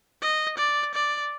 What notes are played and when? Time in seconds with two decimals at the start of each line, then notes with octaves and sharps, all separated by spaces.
0.22 D#5
0.58 D5
0.95 D5